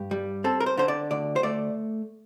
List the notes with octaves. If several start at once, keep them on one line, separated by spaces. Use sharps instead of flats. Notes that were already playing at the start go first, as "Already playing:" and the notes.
Already playing: G2 G4
G3
C4 A4
A#4
C5
D3 C5
D5
D2 D5
C5
A3 D5